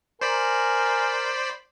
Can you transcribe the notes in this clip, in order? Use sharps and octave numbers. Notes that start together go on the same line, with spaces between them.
A#4 C5 D5 G#5 B5